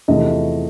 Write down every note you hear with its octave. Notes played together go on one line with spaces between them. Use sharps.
E2 C3 F3 A3 D#5